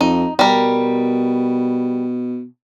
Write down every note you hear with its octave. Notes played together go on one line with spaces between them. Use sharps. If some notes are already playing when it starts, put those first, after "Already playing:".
F2 D#4
B2 G3 A#4